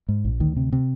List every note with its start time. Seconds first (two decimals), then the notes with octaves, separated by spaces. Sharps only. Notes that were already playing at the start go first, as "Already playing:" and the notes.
0.09 G#2
0.24 A#1
0.40 D2 D#3
0.57 C3
0.72 C3